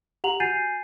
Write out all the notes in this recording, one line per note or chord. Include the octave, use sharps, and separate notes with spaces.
G4 F#5 A#5 F7 F#7
F#4 G#5 G6 A6 C7 D#7